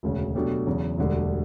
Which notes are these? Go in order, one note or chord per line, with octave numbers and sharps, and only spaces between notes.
E1 D2 C#3
B2 F#3 A3 D4 G4
E2 C#3 F#3
E1 D2 D3 G3